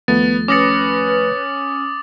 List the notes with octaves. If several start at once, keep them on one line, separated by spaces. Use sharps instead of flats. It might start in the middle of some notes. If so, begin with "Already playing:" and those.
D#2 F3 A3 B3 A6
C#4 B4 D6 D#6 A6 A#6 C#7